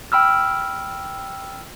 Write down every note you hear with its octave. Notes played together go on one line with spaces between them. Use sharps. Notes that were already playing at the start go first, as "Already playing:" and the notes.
G5 B5 E6 F6